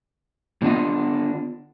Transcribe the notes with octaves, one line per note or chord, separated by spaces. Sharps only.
A2 D3 B3 D4 F4 D#5